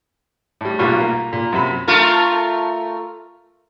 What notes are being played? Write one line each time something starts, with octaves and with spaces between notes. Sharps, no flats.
A2 G3
B1 A#2 G3 F4 B4 C#6
A#3
A#2
F#2 C3 B5
A3 F4 A#4